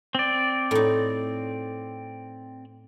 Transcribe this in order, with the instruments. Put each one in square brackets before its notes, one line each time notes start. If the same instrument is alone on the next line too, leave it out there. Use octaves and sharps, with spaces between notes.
[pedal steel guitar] C4 D5
[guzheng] A2 D#4